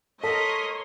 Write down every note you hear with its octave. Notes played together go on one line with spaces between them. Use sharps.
A4 A#4 C#5 D#5 C6 B6